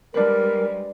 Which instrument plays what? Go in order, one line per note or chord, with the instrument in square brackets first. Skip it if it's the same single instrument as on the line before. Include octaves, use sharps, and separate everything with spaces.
[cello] G3 G#3 [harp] D4 B4 [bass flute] A#4